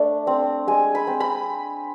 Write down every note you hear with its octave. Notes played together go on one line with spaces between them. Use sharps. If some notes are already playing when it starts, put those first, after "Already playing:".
Already playing: A3 D4
C4
G#3 G#5
B5
C4
B5